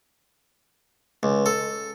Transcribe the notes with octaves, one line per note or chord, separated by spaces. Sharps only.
C#2
A4